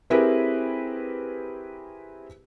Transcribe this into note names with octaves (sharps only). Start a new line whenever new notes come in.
C4 E4 G4 G#4 A#4 B4